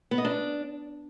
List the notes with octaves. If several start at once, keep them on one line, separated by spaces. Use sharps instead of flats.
B3
D#5
D4